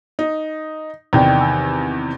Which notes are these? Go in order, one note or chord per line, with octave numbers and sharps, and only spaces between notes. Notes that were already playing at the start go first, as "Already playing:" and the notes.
D#4
E2 C3 D#3 D5 G5
G#5 E6